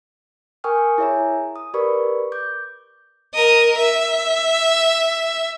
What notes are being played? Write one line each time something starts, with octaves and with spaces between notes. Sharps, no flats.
A#4 G5 G#5 C#6 D#6 F6
E4 G#4 C#5 E5 G#5 A#5
D#6
G4 A#4 B4 D5 B5 C#6
D6 G6
A#4 D#5
E5